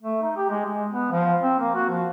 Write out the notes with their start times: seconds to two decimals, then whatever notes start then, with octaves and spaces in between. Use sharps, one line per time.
0.03 A3
0.22 D#4
0.36 G4
0.50 G#3
0.65 G#3
0.91 B3
1.11 F3
1.41 C4
1.59 A#3
1.75 F#4
1.89 F3